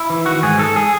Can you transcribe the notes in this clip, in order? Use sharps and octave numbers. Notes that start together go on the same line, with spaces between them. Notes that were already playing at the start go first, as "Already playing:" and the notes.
Already playing: E4
E3
D#3 F#4
G#2 G#4
G#2 A4
G#4